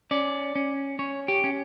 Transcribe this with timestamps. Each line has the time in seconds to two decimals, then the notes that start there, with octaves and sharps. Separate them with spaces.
0.11 C#4 D5
0.55 C#4
0.99 C#4 C#5
1.28 G4
1.44 C#4